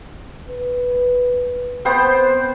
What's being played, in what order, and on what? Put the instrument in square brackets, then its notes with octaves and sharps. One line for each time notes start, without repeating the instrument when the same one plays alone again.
[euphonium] B4
[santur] B3 C5 G5 [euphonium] C4